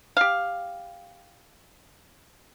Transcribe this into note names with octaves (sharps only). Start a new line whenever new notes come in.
G4 F5